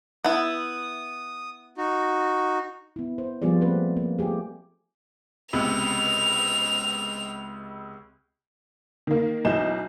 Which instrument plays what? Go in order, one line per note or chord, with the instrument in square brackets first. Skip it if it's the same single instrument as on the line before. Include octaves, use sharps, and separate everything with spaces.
[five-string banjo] B3 E4 [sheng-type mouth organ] D#6
[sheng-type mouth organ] D#4 F#4
[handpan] B3 E4
C5
F3 G3 B3 F4 G#4 D5
A3 A#3 C4 B4
A#3
A3 F4 G4 G#4
[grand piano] C#2 C3 B3 [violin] F7
[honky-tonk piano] D#3 A#3
B1 E3 E4 D#5 G6 E7